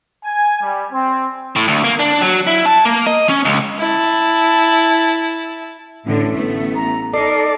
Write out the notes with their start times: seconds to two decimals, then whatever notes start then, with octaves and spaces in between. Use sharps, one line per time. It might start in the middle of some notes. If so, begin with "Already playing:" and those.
0.24 G#5
0.60 G3
0.91 C4
1.56 A2
1.68 D2
1.84 A#3
2.00 D4
2.21 F#3
2.47 E4
2.66 A5
2.85 A#3
3.07 D#5
3.29 C#4
3.45 C#2
3.79 E4 A5
6.06 A1 A2 D3
6.35 A3 B3
6.75 A#5
7.14 D#4 A4 A#4 D5 C7